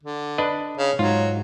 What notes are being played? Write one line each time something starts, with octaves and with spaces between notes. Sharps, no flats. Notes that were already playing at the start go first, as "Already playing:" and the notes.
D3
D4 B4 D#5
C#3
G#2 F#3 F4